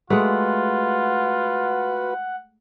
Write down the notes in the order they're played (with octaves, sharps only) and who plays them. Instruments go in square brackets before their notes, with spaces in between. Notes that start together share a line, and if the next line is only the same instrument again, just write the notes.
[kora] G#3 A3 [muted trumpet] F4 [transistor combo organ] F#4 B4 [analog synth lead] F#5